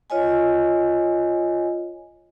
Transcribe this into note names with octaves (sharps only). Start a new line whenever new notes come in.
F4 C#5 D#5 G#5